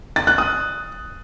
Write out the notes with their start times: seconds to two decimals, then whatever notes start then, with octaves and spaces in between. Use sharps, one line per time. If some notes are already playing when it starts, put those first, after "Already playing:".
0.16 A6
0.27 F#6
0.38 D#6